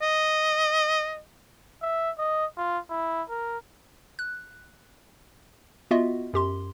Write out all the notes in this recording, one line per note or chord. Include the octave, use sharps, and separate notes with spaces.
D#5
E5
D#5
F4
E4
A#4
F#6
B3 F4 F#4 D#5 E5
F#2 G4 C6